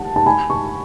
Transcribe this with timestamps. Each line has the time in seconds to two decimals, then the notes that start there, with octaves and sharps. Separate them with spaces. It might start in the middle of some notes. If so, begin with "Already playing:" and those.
Already playing: F#5 A5
0.16 A5
0.26 G#5 B5
0.50 A5 C#6